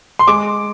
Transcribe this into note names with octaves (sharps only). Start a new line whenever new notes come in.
C6
G#3 D6